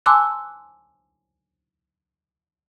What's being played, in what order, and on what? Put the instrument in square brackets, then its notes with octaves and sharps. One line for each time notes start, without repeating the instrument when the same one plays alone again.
[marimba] G#5 A5 C6 D6 E6 F#6